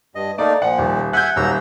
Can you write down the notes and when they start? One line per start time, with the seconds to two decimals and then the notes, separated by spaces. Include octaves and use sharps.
0.15 G2 D#5
0.38 A3 A#3 D#4 D5
0.62 A#2 F3 F#5
0.78 D#1
1.13 E5 F#5 G#5 F#6 G6
1.36 D#1 F#3 A#5 E6